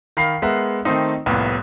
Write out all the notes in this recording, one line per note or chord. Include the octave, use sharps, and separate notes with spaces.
D#3 F5 B5 C7
G#3 B3 A#4 E5 F#5
D#3 A3 C4 D#4
F1 C2 A2 A#3 B3